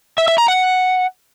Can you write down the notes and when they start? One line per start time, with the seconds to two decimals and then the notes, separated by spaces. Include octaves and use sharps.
0.18 E5
0.28 E5
0.38 A#5
0.48 F#5